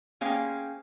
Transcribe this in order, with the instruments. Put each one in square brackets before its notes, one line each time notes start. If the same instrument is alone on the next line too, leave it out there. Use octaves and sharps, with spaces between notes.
[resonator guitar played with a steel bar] A#3 C#4 G#4 C5 F5 G5